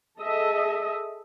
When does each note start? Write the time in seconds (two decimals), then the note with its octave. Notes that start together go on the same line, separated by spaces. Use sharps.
0.19 G#4 A4 D#5 E5